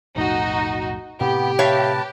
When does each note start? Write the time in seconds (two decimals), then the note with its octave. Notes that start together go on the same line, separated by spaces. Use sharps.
0.16 B1 F2 A2 D#4 F#4
1.21 A2 C3 B3 G4
1.59 B4 C#5 E5 F5 A5